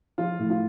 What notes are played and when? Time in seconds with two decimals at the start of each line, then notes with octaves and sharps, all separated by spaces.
0.18 F3 F4
0.39 A2
0.50 F4